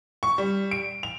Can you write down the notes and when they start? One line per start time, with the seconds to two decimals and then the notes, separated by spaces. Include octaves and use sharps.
0.23 C#6
0.38 G3
0.71 D7
1.03 F7